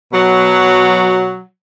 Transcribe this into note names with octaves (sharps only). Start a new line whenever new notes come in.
B2 F#3